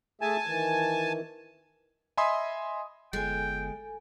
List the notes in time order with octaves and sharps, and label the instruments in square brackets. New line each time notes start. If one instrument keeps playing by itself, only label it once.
[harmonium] A3 G#4 E5 [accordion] G#5 A5
[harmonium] D#3 E3
[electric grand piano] D#5 E5 G#5 B5 C6 D#6
[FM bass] G1 [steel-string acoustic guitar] G#3 [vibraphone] A4 G#5 [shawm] G5